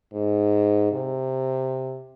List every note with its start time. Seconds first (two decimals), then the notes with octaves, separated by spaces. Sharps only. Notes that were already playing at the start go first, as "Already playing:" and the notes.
0.13 G#2
0.92 C3